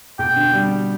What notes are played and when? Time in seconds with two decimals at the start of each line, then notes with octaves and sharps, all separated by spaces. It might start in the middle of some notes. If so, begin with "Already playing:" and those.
0.19 B2 G5
0.36 D3
0.53 G3